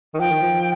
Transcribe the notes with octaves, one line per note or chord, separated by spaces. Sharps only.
D#3
F3 G5
D#3
F3